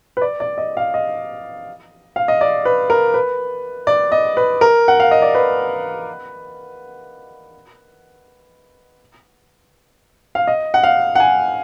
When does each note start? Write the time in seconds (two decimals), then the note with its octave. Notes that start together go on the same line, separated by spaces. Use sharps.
0.17 B4
0.22 D5
0.40 D5
0.58 D#5
0.77 F5
0.94 D#5
2.16 F5
2.28 D#5
2.41 D5
2.65 B4
2.90 A#4
3.14 B4
3.87 D5
4.12 D#5
4.37 B4
4.61 A#4
4.88 F#5
5.00 F5
5.11 D#5
5.22 D5
5.35 B4
10.35 F5
10.47 D#5
10.74 F#5
10.83 F5
11.15 F#5
11.20 G#5